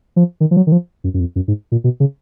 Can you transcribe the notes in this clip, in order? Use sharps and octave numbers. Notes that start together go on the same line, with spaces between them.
F3
D#3
F3
F#3
D#3
F3
F#2
F#2
F2
F#2
G#2
A#2
B2
C#3